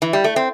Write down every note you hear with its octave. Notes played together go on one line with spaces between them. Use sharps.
E3
G3
A3
C4